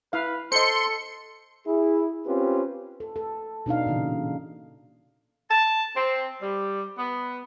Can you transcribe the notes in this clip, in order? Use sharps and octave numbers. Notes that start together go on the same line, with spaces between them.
E4 B4 F5
A4 C5 D#5 C6 C#7
E4 G#4
C4 C#4 F4 G4 B4
A4
A4
B2 D4 D#4 F5
A#2 C#3 E3
A5
C4
G3
B3